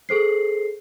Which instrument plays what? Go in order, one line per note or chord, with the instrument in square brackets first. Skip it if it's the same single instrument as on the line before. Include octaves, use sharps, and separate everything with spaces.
[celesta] G#4 A4 C5 C7